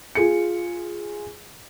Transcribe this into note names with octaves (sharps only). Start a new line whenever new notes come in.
F4 G#4 C#7